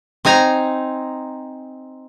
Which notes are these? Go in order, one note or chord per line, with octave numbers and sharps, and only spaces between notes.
C4 D#4 G#5 A#5